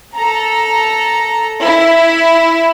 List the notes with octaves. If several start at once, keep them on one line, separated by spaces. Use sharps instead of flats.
A4 A#5
E4